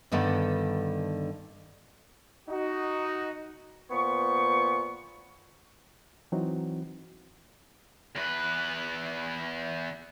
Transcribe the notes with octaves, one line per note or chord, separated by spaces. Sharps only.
G2 D3 D#3 B3 A4 F#5
D#4 F#4
A#2 B3 C5 C#6
E3 F#3 C4 D#4 F#4
E2 B4